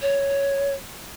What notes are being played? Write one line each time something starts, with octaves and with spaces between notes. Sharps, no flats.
C#5